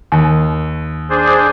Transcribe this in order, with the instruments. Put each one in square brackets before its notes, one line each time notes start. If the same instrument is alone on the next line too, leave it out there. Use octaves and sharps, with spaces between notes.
[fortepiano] D#2
[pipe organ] D4 G#4 C5